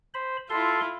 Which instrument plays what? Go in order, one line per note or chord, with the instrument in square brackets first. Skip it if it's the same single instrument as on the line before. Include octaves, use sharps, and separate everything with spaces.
[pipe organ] C5 B5
[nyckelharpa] E4 F4 [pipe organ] A4 C6